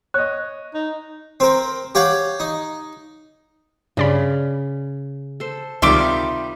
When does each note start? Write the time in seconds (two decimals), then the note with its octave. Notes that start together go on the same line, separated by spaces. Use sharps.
0.14 C#5 D#5 F#6
0.74 D#4
1.40 C4 A#4
1.95 G4 C#5 F5 F#5
2.40 D#4
3.97 G2 C#3 D5 B5
5.40 A4 C5
5.82 C#2 C3 D#3 G3 F4 E5 C6 D6